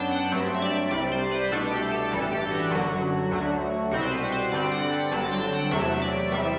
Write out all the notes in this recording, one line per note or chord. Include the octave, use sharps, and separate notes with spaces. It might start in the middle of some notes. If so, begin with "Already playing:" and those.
Already playing: F#2 F#3 B3 D4 G5 A5
F#5
G2 F#3 A3 C4
E5
D5
C2 C3 G3 D5
C5
B4
C2 B2 A3 D4 A4
G4
A4
A1 G2 E3 G3 A4
A4
G4
F#4
G1 F#2 D3 F#3
D2 D3 F#3 A3 F#4
C2 B2 G3 C4 F#4
C5
B4
C5
G2 D3 G3 C4 D5
F#5
B5
G1 G2 D3 F#3 C4 A5
G5
F#5
E2 C3 F#3 A3 E5
D5
E2 C3 G3 E5